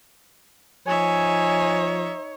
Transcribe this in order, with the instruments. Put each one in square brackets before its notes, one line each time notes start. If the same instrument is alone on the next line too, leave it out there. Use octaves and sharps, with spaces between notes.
[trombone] F3 [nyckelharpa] D#4 E5 [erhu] C#5 [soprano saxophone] G#5